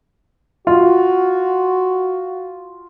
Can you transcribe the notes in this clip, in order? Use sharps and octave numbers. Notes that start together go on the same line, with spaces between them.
F4 F#4